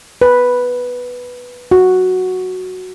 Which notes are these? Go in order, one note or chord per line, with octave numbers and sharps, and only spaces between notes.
B4
F#4